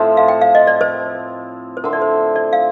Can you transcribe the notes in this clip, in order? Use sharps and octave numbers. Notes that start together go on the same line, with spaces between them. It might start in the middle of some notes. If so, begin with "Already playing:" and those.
Already playing: A2 F3 C4
F5
G5
F5
D#5
D5
C5
C5
D3 A3 C4 A#4
D5
C5
D5
F5